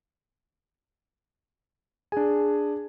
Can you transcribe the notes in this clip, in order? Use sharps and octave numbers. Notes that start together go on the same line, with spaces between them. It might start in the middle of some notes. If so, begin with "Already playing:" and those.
D4 G#4 G#5